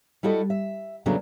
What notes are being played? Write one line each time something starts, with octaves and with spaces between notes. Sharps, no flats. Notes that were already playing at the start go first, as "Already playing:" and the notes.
G3 E4 F#4 A4 D#5
E5
E2 C#3 F#3 A3 B3 D4